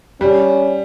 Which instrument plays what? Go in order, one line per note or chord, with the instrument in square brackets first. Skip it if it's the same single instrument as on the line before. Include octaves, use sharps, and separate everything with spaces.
[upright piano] G3 [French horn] C#4